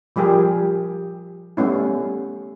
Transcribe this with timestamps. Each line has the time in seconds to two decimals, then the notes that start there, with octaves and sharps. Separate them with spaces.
0.16 F3 G3 G4 G#4 A#4
1.57 G3 A3 B3 C#4 E4